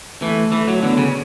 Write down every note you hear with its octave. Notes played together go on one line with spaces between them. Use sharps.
E3 A3
E3 A3
F#3
D3 B3
C#3